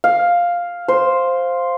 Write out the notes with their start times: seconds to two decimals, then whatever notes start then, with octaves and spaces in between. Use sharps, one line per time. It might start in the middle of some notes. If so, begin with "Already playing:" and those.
0.04 F5
0.88 C5